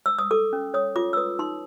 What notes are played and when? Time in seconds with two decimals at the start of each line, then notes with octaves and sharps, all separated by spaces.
0.06 E6
0.19 D#6
0.31 A4 D6
0.53 C#4
0.74 C#5 D#6
0.96 F4 D6
1.13 E6
1.17 B4 D#6
1.39 D#4 C6